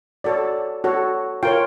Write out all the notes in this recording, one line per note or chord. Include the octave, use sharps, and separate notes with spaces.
F#4 A4 C#5 D5
F#4 A4 C#5
F4 A#4 C#5 G5